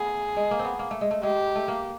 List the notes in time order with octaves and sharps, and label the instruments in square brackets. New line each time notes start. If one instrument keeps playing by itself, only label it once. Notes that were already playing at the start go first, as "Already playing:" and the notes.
Already playing: [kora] A3 B3 [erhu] G#4
[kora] G#3
A#3
C4
B3
A#3
A3
G#3
A3
[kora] G#3 [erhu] G4
[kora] A3
A#3